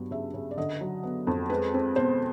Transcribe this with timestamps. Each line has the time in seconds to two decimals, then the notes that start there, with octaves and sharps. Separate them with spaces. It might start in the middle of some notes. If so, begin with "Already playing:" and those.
Already playing: G2 F#3 B3
0.11 C#3 E5
0.34 C#3
0.51 D5
0.57 D3 D#5
0.81 F#3
1.03 B3
1.27 F2
1.50 G#3 B4
1.74 C4
1.96 B2 C5